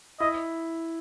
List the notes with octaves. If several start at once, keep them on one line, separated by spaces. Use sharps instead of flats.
E4 D#5